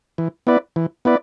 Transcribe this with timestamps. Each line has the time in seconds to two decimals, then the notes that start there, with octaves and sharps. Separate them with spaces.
0.18 E3
0.47 B3 E4 B4 D5
0.76 E3
1.05 B3 E4 B4 D5